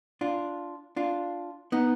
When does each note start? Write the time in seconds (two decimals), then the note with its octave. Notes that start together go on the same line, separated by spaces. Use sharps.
0.21 D4 F4
0.96 D4 F4
1.72 B3 D#4